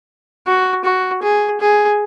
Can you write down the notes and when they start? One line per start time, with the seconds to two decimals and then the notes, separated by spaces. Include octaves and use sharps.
0.47 F#4
0.85 F#4
1.22 G#4
1.61 G#4